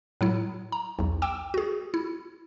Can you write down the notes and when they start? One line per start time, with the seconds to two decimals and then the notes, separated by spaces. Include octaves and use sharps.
0.21 A2 F#3 E4
0.72 A#5
0.99 B1 E2
1.22 G5 D6 E6 E7
1.54 F#4 G#4
1.94 E4